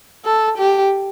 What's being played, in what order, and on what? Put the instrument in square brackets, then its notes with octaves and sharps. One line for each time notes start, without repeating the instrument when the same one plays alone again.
[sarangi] A4
G4